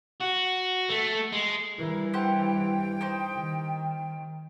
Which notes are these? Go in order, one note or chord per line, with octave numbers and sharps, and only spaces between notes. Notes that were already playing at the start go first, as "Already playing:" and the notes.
F#4
A3
G#3
G2 E3 A#4
G4 C5 F#5 G5
D#4 G4 C5
D#3